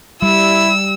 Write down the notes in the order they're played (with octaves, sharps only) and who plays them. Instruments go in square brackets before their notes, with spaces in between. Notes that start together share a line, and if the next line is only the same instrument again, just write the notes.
[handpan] G3 [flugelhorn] E4 [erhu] E6